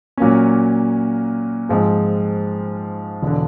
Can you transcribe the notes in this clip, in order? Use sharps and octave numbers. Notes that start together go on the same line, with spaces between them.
A#2 F#3 A#3 C#4
G#2 F3 G#3 C4
E1 D3